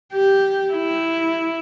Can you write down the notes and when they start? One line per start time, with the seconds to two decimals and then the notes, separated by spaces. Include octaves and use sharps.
0.13 G4
0.72 E4